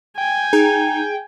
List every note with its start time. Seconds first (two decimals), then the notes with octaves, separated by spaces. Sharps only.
0.18 G5 G#5
0.53 D#4 G#4